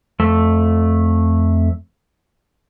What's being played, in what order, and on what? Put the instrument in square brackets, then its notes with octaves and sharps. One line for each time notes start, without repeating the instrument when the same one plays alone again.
[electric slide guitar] F2 A3